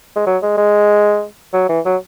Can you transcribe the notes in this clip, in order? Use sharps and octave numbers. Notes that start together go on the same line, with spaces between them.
G#3
F#3
G#3
G#3
F#3
E3
F#3